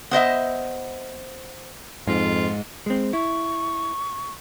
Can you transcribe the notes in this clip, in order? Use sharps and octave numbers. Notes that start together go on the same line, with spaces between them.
B3 C5 D#5 E5
F2 G#2 F4
G#3 C4
E4 C#6